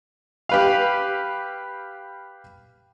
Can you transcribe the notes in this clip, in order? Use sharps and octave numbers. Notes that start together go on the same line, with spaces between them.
G4 B4 F5